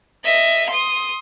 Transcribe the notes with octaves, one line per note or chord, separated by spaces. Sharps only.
D#5 E5
C6 D#6